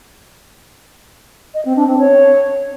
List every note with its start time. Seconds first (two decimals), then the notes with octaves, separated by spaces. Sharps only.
1.54 D#5
1.65 C4
1.76 D4
1.87 C4
1.98 C#5